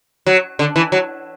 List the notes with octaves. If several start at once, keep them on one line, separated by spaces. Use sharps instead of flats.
F#3
D3
E3
F#3